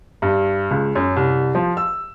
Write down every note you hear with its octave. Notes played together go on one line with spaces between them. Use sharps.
G2
C#2
F#2
C2
F3
E6